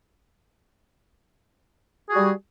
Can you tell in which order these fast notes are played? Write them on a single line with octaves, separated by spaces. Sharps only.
G#4 F#4 G3